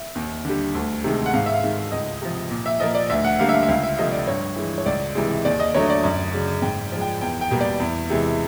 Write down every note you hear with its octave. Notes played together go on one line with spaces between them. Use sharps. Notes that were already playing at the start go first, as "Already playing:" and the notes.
Already playing: E5
D#2
D3 G3
D2
C3 D#3 G#3
F#5
G#2 F5
E5
F5
D#3 G#3
C#2 D#5
C3 F3
A#2
E5
F3 A#3 D#5
D5
D2 E5
F#5
D3 G3 A#3 F5
E5
F5
E5
C#2 F5
E5
C3 F3 A3 D#5
D5
G2 C#5
E3 G#3
C#5
C#2 D5
C3 E3 G#3
D#2 D5
D#5
D3 F#3 A3 C#5
D5
F#2
C#3 F#3
G#2 G5
F3 G#3
G5
E2 G5
G5
B2 G3 A#3
D5
E2
C3 E3 G#3